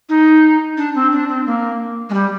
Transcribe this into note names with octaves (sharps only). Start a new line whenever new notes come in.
D#4
D4
C4
D4
C4
A#3
G#3
G3